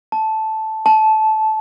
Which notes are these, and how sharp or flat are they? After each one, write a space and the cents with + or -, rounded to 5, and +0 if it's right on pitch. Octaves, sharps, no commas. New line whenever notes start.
A5 -5
A5 -15